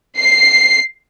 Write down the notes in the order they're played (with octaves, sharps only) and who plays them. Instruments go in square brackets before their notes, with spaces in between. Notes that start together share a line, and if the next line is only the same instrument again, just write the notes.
[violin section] C7